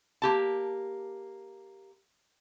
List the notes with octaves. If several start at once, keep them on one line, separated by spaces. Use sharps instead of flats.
A#3 G4 A5